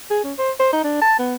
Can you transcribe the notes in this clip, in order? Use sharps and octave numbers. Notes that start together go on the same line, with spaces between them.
G#4
C#4
C5
C5
D#4
D4
A5
B3